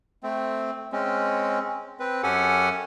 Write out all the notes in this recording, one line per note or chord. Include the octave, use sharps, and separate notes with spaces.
A3 C4
G#3 C4 C#4
C4 B4
F#2 C#4 G4 A4 F#5 G#5